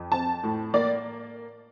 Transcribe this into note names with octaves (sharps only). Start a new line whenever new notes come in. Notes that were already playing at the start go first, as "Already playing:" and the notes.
Already playing: F2
C4 A5
A2
A#3 D5